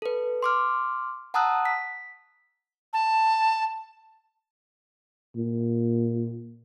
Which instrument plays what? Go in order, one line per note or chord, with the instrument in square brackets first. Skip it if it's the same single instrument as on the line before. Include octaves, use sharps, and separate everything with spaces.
[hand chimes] A4 B4
C6 D6 F6
F#5 A5 A#5 D#6 E6 F#6
B6
[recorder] A5
[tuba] A#2